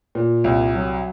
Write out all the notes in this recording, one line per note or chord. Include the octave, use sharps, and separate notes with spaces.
A#2
C2
F#3